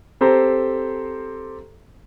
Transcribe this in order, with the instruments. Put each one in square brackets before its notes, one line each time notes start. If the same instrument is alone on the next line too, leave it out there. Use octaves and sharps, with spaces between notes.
[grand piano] C4 G4 A4 C5 A#5